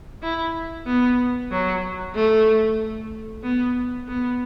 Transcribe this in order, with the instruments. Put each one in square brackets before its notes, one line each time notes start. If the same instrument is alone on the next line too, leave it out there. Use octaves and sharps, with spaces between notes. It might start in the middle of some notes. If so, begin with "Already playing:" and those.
[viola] E4
B3
F#3
A3
B3
B3